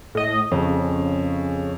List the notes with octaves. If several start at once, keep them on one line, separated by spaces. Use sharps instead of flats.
A2 D#5
F2 C#3